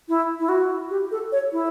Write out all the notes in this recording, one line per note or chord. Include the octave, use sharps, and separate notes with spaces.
E4
E4
F#4
G4
A4
C#5
E4